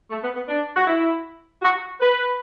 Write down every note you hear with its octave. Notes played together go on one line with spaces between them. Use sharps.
A3
B3
B3
D4
F#4
E4
F#4
B4